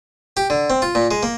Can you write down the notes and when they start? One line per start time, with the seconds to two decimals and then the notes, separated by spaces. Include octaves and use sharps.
0.37 G4
0.50 D3
0.70 C4
0.82 F4
0.95 A#2
1.11 G#3
1.23 A#3